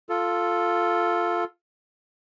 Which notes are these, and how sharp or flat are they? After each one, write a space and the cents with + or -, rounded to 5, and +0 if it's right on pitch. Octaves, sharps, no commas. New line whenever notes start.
F4 +0 A4 +0